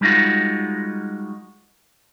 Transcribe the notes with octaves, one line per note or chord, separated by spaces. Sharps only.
G3 G#3 D#4 F4 F#4